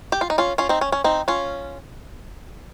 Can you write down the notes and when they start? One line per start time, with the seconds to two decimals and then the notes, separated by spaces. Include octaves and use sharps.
0.12 G4
0.21 F4
0.30 D#4
0.38 C#4 F4
0.58 C#4 F4
0.69 C4 D#4
0.81 C#4
0.92 C#4
1.04 C4 D#4
1.28 C#4 F4